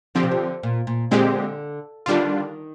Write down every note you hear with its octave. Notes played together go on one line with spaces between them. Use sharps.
D3 F3 C4 G4
C3
D3
A#2
A#2
A#2 D3 G#3 C4 G4
D3 D#3 G3 D4 F4